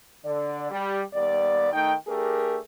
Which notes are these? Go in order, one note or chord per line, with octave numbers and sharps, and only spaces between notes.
D3 D5
G3
D#2 G3 B3 D5
D#3 A3 D#4 G5
A3 D4 G4 G#4 A#4